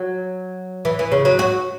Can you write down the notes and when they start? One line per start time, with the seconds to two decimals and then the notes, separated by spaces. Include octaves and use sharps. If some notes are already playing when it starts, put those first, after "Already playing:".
Already playing: F#3
0.85 E3
0.99 E3
1.12 C#3
1.25 F#3
1.39 F#4